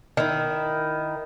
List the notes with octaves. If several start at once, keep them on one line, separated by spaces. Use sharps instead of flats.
D#3 E4